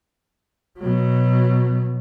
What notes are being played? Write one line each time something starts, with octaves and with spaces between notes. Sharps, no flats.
B2 F#3